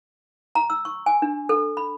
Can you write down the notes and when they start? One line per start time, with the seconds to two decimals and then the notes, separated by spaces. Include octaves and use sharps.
0.55 A#5
0.70 E6
0.85 C#6
1.06 G#5
1.22 D4
1.49 A4
1.77 B5